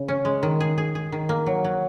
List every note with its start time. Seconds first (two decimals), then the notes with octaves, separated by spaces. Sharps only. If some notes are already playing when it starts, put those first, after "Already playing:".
Already playing: C#3
0.08 C#4
0.25 G#3
0.43 D#3
0.60 G#4
0.78 G#4
0.95 G#4
1.12 D#3
1.29 A#3
1.46 F#3
1.64 F#3